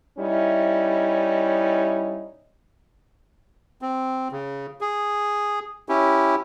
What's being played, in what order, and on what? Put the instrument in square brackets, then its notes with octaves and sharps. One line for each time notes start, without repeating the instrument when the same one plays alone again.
[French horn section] G3 C#4 D#4 E4
[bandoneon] C4
C#3
G#4
C#4 E4 G4